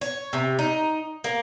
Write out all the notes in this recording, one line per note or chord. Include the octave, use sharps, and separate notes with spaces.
C#5
C3
D#4
A#3